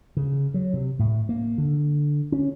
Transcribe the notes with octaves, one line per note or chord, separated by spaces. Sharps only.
C#3
F#3
C3
A2
A#3
D3
C#4